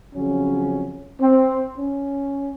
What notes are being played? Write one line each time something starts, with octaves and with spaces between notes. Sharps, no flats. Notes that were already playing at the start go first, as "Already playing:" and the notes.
F2 C#3 F#3 C#4
C4
C#4